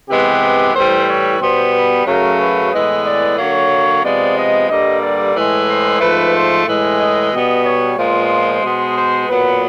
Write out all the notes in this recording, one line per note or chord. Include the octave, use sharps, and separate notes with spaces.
C3 E3 G#3 B3 G4
A2 E3 G3 C5
C#5
B2 G3 B3 C5
B4
F#2 C#3 F#3 A3 A#4
B4
A2 E3 G#3 B3 D#5
D5
D3 F#3 A#3 C#5
C3 F3 G#3 B3 D5
D#5
G2 D3 G3 A#3 D#5
D5
A2 E3 G#3
C5
G#2 F3 A3 B4
C5
A2 E3 G#3
D#5
B2 G3 B3
C#5
A#2 F3 G#3 B3 C5
B2 G#3 B3
C5
A#2 F#3 B3 B4